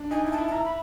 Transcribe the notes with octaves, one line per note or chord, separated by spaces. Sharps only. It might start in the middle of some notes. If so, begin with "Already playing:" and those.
Already playing: D4
D#4 G#5
E4 G#5
A5
E4
A5
E4 A#5
B5